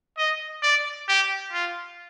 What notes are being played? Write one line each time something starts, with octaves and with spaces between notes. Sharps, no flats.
D#5
D5
G4
F4